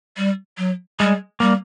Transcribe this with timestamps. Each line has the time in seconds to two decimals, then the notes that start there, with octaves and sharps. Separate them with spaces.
0.17 G3
0.58 F#3
1.00 G3 G#3
1.40 G3 A#3